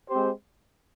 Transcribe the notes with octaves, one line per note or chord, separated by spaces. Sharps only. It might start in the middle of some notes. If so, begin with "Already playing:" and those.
G#3 C4 G4 C5